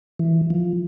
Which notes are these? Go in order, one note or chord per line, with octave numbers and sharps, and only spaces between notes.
E3
F3